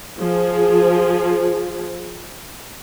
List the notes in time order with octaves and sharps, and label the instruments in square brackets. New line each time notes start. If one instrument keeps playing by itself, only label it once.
[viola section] F3 G#4